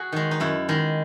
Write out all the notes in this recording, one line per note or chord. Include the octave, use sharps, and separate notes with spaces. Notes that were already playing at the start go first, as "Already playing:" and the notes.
Already playing: F#4 G#4
D#3 G#3
D#4
F#2 E4
D#3 G#3